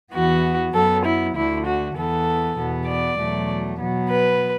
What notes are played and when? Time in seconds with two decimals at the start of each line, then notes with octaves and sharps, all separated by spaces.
0.14 E2 E3 B3 F#4
0.75 F#2 F#3 B3 A4
1.05 E4
1.36 D2 D3 A3 E4
1.66 F#4
1.96 E2 E3 B3 A4
2.58 E2 B2 B3
2.88 D5
3.18 E2 B2 F#3 A3
3.79 B2 F#3 B3
4.09 B4